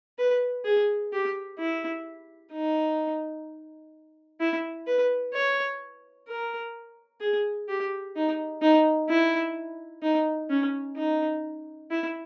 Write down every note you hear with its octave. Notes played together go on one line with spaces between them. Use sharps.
B4
G#4
G4
E4
D#4
E4
B4
C#5
A#4
G#4
G4
D#4
D#4
E4
D#4
C#4
D#4
E4